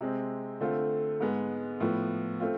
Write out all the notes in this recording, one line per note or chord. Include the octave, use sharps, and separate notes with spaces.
C3 G#3 C4
D3 A3 C4 F4
G#2 G#3 B3
A2 F3 B3
A3 C4 F4